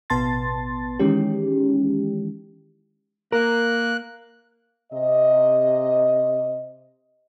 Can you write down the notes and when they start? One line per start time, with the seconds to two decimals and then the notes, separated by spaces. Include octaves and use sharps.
0.10 A1 B2 B3 A5 C6 A6
0.99 D#3 E3 G#3 C#4 G4
3.32 A#3 A#4 F#6
4.92 C3 D#5